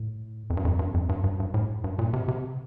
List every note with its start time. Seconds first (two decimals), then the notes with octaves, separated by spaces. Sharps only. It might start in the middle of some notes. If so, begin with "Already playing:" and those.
Already playing: A2
0.50 F2
0.57 G2
0.65 F2
0.79 G2
0.94 F2
1.09 G2
1.24 G2
1.40 G2
1.54 A2
1.84 G2
1.99 A#2
2.13 C3
2.28 C3